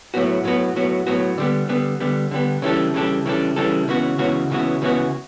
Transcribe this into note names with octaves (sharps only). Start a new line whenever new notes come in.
A2 F#3 B3 F#4
A2 F#3 B3 F#4
A2 F#3 B3 F#4
A2 F#3 B3 F#4
D3 G3 B3
D3 G3 B3
D3 G3 B3
D3 G3 B3
C#3 E3 G3 D4 A4
C#3 E3 G3 D4 A4
C#3 E3 G3 D4 A4
C#3 E3 G3 D4 A4
C#2 C#3 E3 B3 F#4
C#2 C#3 E3 B3 F#4
C#2 C#3 E3 B3 F#4
C#2 C#3 E3 B3 F#4